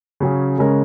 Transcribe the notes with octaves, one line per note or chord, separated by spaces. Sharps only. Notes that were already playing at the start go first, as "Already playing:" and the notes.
C#3 F#3 C#4 G#4
C#3 G#3 C#4 A#4